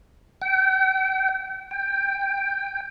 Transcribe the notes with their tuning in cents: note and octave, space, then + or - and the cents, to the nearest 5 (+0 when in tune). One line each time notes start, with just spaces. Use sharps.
G5 -40
G5 +10